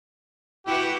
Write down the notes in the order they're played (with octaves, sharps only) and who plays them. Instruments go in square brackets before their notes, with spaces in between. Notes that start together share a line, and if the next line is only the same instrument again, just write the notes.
[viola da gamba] E4 F#4 B4 [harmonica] G4